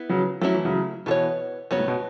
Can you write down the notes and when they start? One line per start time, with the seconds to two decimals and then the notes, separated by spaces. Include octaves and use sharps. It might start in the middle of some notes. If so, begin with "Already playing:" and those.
Already playing: B3 E4
0.09 C#3 F#3
0.42 F#3 A3 C#4 E4
0.54 E3
0.65 C#3 F#3
1.06 B2 E3 B3 A4
1.11 C#5
1.71 C#3 F#3 B3 F#4 C#5
1.79 A2
1.88 B2